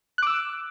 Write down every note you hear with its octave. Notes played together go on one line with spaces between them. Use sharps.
D6 E6 F#6